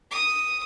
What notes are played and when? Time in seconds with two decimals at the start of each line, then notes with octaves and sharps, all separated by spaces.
0.11 D#6